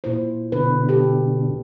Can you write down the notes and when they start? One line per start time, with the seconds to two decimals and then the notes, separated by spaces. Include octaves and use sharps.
0.04 A#2 E4 C5
0.52 B2 D3 B4
0.89 G4 A4